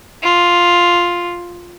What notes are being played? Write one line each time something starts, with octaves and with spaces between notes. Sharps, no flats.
F4